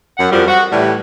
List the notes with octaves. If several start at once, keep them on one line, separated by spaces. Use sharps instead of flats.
F#2 F#5
F2 F3 G3 F#4 A#4
F#4 F#5
A2 E3 G3